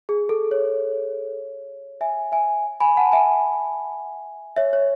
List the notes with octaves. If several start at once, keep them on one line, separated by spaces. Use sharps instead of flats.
G#4
A4
C#5
E5 G#5
E5 G#5
G#5 B5
F#5 A5
E5 G#5
C#5 E5
C#5